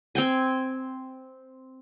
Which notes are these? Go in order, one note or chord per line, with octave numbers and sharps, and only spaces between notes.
C4 G5 G#5